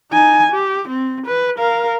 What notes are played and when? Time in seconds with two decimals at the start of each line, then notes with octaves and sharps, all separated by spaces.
0.12 D#4 G#5
0.52 G4
0.88 C4
1.26 B4
1.58 A#4 F5